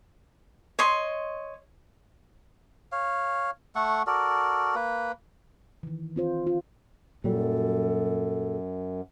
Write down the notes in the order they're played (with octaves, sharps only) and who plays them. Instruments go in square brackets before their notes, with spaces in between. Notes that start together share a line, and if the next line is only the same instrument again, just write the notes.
[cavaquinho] C#5 D#5 C6
[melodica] C#5 F5
A3 A4 F#5 C#6
F#4 A4 A#4 D5
A#3 B4
[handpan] D#3 E3
C4 F4 C5
F4
[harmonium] F#2 [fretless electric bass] A#2 F#3 G3 [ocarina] A4